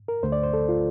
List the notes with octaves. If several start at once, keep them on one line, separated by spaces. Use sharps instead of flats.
A#4
D2 D3 A3 C5
D5
C5
A4
F4